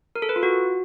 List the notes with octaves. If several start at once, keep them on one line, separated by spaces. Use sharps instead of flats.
A#4
A4
B4
F4
F#4